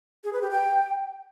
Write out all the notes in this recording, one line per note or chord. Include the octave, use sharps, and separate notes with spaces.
G#4
B4
G4
G5